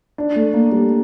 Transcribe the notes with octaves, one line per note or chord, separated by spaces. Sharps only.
D4
A3
A#3
G3